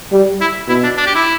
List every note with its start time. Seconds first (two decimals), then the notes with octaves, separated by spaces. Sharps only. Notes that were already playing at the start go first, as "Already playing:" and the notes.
0.12 G3
0.41 E4
0.68 B2 E4
0.83 D4
0.97 D4
1.06 G4
1.15 E4